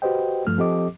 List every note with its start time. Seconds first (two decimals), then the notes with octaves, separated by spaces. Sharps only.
0.02 F#4 G4 B4 C5 D#5 G5
0.47 G2 F3 A3 F6
0.58 F3 C4 G4 A4 D#5 D6